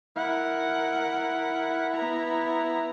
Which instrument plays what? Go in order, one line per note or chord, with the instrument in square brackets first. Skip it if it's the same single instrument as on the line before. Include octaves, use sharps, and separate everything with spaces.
[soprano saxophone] E4 [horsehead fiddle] A#4 F#5
[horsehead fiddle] B3 A#5